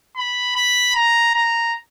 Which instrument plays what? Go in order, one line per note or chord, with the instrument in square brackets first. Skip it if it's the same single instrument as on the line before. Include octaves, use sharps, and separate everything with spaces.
[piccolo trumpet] B5
B5
A#5
A#5